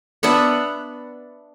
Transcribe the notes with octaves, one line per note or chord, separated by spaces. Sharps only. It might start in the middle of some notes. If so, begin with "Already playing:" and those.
B3 D4 E5 F#5